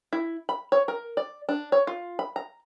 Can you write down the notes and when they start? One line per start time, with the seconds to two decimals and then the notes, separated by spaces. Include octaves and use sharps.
0.13 E4
0.49 B5
0.72 C#5
0.88 A#4
1.17 D5
1.49 D4
1.72 C#5
1.87 F4
2.19 B5
2.36 A#5